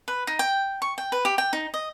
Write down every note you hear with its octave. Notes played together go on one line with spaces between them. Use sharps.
B4
D#4
G5
C#6
G5
B4
G4
G5
D#4
D#5